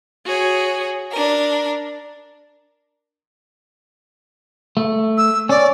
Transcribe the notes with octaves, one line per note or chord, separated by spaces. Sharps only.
F#4 G#4 C#5
D4 A#4
A3
E6
C#4 D5